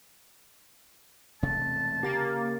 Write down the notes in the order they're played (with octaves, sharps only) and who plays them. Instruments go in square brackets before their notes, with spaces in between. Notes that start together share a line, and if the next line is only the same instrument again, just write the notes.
[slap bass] E1 C3 A3 [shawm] A5
[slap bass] C#3 [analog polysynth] A#3 [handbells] G4 A6